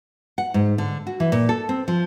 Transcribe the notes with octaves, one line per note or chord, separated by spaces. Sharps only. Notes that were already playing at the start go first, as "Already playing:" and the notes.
F#5
G#2
D3
F#4
E3
A#2
A4
C4
F3